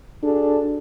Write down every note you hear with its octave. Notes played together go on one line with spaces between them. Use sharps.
D4 F#4 G#4 A4